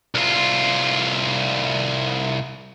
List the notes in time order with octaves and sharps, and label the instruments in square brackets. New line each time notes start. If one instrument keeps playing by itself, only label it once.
[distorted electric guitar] C2 F4